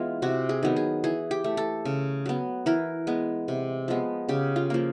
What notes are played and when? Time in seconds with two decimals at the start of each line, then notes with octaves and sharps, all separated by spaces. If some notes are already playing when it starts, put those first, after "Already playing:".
Already playing: E3 G#3 B3 F4
0.22 C3 F#4
0.49 G#4
0.63 D#3 F#3 B3
0.76 G#4
1.04 E3 G#4
1.31 G4
1.44 A3
1.57 A4
1.85 C#3
2.26 F#3 B3
2.66 E3 A#4
3.07 G#3 B3
3.48 C3
3.88 F3 G#3 B3
4.29 C#3 G4
4.56 F4
4.70 F3 A#3